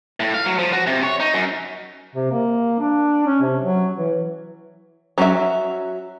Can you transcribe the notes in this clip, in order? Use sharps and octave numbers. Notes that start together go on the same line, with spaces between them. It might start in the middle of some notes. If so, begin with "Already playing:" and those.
A2
F5
F#3
F3
F#4
C3
C#5
D#4
F#2
C3
A#3
D4
C#4
C3
F#3
E3
F#3 C#4 F#4 G#4 E5